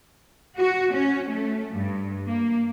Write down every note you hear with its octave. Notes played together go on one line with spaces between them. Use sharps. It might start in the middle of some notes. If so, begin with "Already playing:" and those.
F#4
C#4
A3
G2
A#3